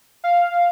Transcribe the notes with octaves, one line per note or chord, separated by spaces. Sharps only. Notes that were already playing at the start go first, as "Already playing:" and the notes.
F5